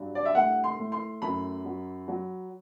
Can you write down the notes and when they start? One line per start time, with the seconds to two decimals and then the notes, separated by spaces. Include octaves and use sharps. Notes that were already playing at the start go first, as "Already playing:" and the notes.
Already playing: G2 F#3
0.15 D5
0.25 E5
0.35 A2 F#5
0.64 C6
0.79 A2
0.92 C6
1.22 F#2 B5
1.65 F#3
2.08 F#3